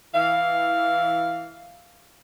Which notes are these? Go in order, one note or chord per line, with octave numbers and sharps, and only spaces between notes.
E3 F5